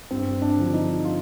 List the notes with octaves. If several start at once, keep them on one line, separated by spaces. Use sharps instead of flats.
G2 C4
D4
D3 F3
D#4
F4